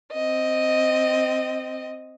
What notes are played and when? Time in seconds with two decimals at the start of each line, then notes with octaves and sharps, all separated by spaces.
0.12 C4 D#5